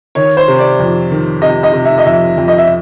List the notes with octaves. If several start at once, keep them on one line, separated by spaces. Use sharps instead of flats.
D#3 C#5
C5
C3
D5
F2
D#3
C3 D#5
D#5
C3
E5
D#5
F2 E5
F2
D#5
E5